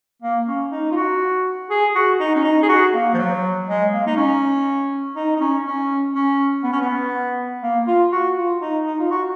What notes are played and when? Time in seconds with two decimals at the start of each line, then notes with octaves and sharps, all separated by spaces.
0.22 A#3
0.47 C#4
0.71 D#4
0.91 F4
0.96 F#4
1.70 G#4
1.95 F#4
2.20 D#4
2.35 C#4
2.44 D#4
2.63 G#4
2.69 F#4
2.93 A#3
3.14 F3
3.18 F#3
3.68 G#3
3.93 A#3
4.06 D#4
4.17 C#4
5.16 D#4
5.36 D#4
5.40 C#4
5.66 C#4
6.15 C#4
6.63 B3
6.72 C#4
6.82 B3
7.63 A#3
7.87 F4
8.12 F#4
8.37 F4
8.61 D#4
8.87 D#4
8.99 F4
9.11 F#4